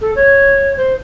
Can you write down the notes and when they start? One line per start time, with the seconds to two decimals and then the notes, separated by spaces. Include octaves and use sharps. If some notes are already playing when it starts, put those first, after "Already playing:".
0.01 A4
0.16 C#5
0.77 C5